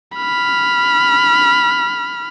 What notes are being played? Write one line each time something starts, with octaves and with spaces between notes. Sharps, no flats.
B5 F6